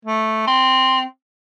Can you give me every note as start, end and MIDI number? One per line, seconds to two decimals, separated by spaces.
0.05 0.45 57
0.47 1.03 60